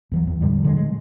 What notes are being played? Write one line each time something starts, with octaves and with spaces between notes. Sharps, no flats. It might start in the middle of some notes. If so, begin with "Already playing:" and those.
E2 E3 F#3
E2
A2 D3 G3 G#3
A#2 D3 F#3 G#3
G#3